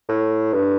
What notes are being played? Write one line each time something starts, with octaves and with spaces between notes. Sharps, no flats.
A2
G2